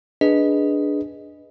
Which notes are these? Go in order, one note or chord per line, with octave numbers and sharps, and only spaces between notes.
D4 G#4 B4 D#5